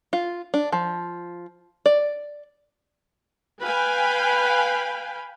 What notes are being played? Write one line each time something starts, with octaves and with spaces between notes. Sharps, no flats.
F4
D4
F3
D5
B4 F5 G5 G#5 B5